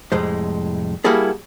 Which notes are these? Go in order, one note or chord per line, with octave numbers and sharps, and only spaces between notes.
C2 F2 A2 G#3 C5
G3 A#3 E4 F#4 G#4 A4